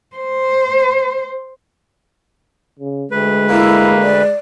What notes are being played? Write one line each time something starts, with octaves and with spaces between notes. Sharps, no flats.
C5
C#3
D2 G#3 B4
A#3 E4
D5